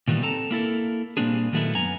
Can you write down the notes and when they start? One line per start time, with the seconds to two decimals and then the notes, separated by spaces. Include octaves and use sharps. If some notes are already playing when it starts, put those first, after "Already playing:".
0.08 A#2 D#3 E3 G3 B3
0.22 C4 A4 A5 A#5
0.51 A#3 E4 A4 A#4
1.17 A#2 G3 A#3 C4 D4 G#4
1.52 A#2 D#3 F#3 A3 B3 E4
1.75 F#2 B3 G#5 A#5